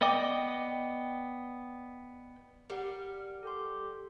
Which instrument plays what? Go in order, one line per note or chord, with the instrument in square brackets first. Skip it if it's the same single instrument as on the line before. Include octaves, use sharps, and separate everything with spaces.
[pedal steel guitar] B3 D5 D#5 G5 D6
[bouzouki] G3 [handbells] A#4 F#5
[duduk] G4 [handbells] A4 C6